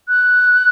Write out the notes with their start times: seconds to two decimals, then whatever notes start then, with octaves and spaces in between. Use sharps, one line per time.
0.09 F#6